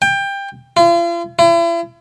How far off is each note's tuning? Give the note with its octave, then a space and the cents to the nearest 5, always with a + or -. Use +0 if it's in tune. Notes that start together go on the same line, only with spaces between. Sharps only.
G5 +20
F4 -40
E4 +40